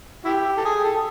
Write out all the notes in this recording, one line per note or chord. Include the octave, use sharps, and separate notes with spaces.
E4 G4
A4
G#4
A4